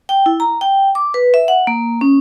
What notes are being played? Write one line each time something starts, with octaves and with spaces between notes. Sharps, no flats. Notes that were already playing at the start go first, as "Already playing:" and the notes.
G5
E4
A#5
G5
D6
B4
E5
F#5
A#3
C#4